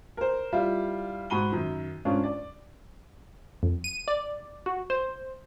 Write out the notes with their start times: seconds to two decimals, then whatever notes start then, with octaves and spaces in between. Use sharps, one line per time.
0.17 A#4 C5
0.53 G3 E4 F4
1.30 G#2 F#4 B5 D#7 G7
1.52 F#2 D#3
2.05 G#2 C#4 D4 F4
2.23 D5
3.63 F2
3.84 D#7
4.08 D5
4.66 F#4
4.90 C5